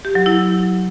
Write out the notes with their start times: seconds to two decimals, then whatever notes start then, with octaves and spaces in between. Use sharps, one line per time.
0.05 G4
0.15 F#3
0.26 E4